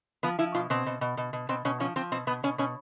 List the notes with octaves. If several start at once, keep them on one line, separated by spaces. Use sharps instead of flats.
F3 B3
F3 E4
B2 F4
B2 C4
B2
B2
B2
B2
B2 C4
B2 C#4
F3 C#4
F3 C4
B2 C4
B2 B3
B2 C#4
B2 C#4